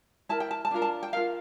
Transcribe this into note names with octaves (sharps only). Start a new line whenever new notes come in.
E4 A#4 A5
G5
A5
A5
D4 F4 A#4
A5
G5
F4 A#4 F5